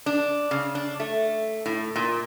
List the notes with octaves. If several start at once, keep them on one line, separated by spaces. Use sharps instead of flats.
D4
C#3
D4
A3
A2
A#2